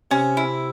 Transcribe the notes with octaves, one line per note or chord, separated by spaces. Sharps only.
C3 C#4
E4